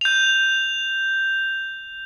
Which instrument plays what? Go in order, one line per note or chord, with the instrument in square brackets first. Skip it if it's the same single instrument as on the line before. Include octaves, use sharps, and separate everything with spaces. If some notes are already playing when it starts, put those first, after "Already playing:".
[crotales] G6 F7